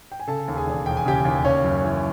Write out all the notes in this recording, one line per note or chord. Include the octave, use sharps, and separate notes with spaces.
G5
G#5
C#3 A4 A5
D#2
G#4 G#5
E1
E1 G5
G#5
C#3 G4 G5
D#2
C#3 C#4 C#5
F#2
E3